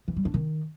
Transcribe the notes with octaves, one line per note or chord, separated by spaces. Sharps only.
E3
G3
D4
D#3